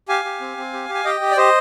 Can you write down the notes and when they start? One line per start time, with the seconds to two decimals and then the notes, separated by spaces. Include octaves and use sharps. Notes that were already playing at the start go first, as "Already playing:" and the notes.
0.09 G4 F5 G#5
0.25 G4
0.41 C4
0.57 C4
0.73 G4
0.89 G4
0.95 G#5
1.05 G4 D#5 G5
1.21 G4
1.31 D5
1.37 G4 C5 D#5